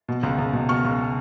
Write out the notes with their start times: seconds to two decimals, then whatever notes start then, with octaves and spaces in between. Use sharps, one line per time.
0.09 B2
0.23 C#2
0.39 C#2
0.53 B2
0.69 B2 C#6 F6
0.85 C#2